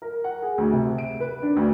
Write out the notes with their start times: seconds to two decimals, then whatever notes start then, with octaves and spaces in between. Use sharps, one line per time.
0.02 A#4
0.24 F#5
0.42 G#4
0.58 D2
0.72 C3
0.98 D7
1.20 B4
1.43 D4
1.56 D2